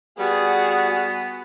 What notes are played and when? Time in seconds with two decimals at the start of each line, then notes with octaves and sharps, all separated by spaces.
0.19 G3 B3 F#4 G#4